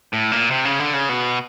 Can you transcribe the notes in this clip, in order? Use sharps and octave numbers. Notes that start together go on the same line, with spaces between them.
A2
A#2
C3
C#3
D3
C#3
B2